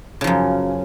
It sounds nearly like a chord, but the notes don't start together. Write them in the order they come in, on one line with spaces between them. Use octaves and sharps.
C#3 F3 F#2